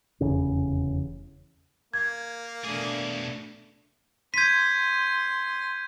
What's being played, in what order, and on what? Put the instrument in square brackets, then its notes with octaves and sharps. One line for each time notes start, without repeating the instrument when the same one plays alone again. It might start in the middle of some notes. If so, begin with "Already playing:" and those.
[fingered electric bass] F1 E2 C#3 C#4
[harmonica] A#3 [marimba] G#6
[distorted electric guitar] B2 G#4 [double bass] A3 D4
[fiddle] C6 [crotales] G6 D#7 [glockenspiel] G#6 B6